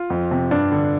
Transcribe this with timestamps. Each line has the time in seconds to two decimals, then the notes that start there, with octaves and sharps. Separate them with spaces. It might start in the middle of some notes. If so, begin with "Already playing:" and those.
Already playing: F4
0.10 F2
0.31 C3
0.51 G2 D4
0.72 D3